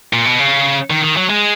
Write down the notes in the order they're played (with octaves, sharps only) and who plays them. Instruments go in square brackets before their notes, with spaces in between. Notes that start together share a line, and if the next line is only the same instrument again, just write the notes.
[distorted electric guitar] A#2
B2
C#3
D#3
D#3
F#3
G#3